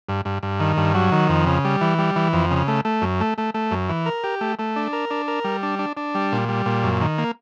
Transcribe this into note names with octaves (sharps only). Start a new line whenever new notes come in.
G2
G2
G2
D#3
G2
F#3
D#3
F2
C#3
G3
E3
G3
E3
F2
C#3
A3
A3
F#2
A3
A3
A3
F#2
E3
A#4
G4
A3
A3
D4
A#4
D4
A#4
G3
D4
D4
D4
G3
A#2
G3
A#2
F#2
D#3
A#3